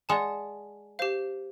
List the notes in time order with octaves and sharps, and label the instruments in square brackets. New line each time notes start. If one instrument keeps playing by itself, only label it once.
[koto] G#3 [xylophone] D5 F#5 A5
[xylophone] G4 C5 F5